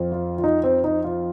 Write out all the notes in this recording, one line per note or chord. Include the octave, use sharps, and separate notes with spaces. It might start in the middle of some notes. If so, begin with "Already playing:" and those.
Already playing: F2 F3
F4
F4
D#4
C4
D#4
F4